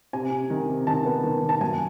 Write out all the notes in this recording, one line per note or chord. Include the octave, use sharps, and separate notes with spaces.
C3 G#5
C3
D#3
C3
D#3 A5
B3
D#3
D#3
A5
F#2 G#5